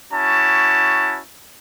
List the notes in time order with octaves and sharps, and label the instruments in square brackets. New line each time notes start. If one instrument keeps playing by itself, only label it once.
[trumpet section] C#4 E4 F#4 A5